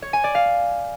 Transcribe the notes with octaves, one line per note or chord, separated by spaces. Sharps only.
C#5
G#5
D5
F5